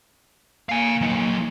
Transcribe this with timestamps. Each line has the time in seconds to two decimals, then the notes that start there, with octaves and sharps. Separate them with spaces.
0.69 A#3 F5 G#5
1.01 F#3 D#4